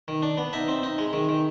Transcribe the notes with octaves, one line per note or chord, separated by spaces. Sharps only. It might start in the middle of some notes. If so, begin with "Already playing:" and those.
D#3
D4
B3
D#4 E5
C4
D#4
G#3
D#3
D#3